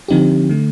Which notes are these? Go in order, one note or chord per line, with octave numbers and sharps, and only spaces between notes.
D3 F3 C4 D#4 G4
D3 A3